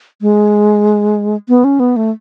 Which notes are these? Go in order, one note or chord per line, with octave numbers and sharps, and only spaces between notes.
G#3
B3
C#4
B3
A3